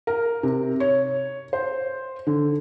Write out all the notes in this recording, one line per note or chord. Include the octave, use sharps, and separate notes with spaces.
A#4
C3
C#5
C5
D3